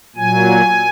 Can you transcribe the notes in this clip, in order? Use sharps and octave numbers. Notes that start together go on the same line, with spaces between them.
A#2 F#3 G#5